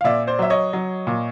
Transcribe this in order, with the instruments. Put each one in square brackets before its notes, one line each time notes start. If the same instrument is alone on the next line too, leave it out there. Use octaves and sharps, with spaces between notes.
[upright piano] F5
A#2 D5 E5
C5 D5
F#3 E5
C#5 D#5
F#3
A#2